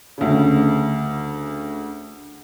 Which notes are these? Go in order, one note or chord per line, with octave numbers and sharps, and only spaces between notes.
D2 C#3